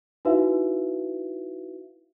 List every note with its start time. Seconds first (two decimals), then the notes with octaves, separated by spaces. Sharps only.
0.25 D#4 E4 F#4 B4 E5 F5